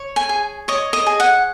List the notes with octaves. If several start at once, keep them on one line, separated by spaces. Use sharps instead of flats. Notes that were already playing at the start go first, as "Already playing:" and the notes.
Already playing: C#5
G#5
G#4
C#5 D#5
D#5
G#4
F#5